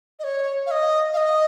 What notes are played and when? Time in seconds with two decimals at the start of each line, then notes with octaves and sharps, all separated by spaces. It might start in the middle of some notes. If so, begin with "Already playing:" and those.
0.19 D#5
0.24 C#5
0.66 F5
0.71 D#5
1.14 F5
1.17 D#5